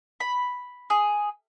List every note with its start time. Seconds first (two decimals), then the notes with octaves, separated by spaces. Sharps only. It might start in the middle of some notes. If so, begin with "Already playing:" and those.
0.20 B5
0.90 G#4